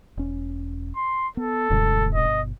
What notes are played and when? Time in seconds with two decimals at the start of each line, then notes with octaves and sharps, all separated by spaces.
0.17 E1 C#4
0.97 C6
1.37 B3 A4
1.70 D#1 F#2 C#3 G#3
2.15 G1 B2 D#5